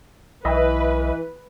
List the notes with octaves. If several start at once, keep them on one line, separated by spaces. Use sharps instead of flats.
B1 E3 B4 D#5 E5